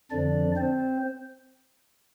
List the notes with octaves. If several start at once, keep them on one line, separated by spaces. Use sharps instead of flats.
F2 D3 F3 D4 D5
C4 C5